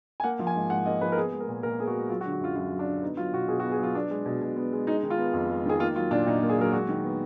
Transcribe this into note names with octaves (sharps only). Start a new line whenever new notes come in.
G#5
A#3 F#5
F3
G#5
G#2
G#2 F#5
A#3 D#5
F3 B4
A#4
B3 G#4
G#3
A#4
A#2
A#2 A#4
B3 G#4
F#4
G#3
F#3 F4
F#4
D3
F#4
F#2 F4
F#2 F4
F#3
D4
D3
B3 D#4
F#3 F4
B2 F#4
B2 G#4
F#4
B3
G#4
F#3 F4
B3 D4
G#3
B2
B2
B3
G#3
G#3 D#4
D#3
F4
B3
F2
G#3
D#3 G#4
A#3 F4
F#3 F4
A#2 D4
A#2 D#4
F4
A#3
G#4
F#3 A#4
G#3 F#4
D#3
B3